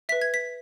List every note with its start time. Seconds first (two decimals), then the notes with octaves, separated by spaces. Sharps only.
0.09 B4 E5 B6
0.22 G#6
0.34 B6